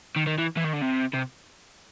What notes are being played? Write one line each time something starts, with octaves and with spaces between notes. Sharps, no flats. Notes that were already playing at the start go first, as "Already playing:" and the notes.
D#3
D#3
E3
E3
D#3
D3
C3
C3